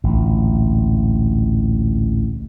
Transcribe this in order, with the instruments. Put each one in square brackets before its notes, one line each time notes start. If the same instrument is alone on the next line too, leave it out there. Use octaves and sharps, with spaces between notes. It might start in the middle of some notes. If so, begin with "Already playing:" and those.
[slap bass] A1 D2 A#2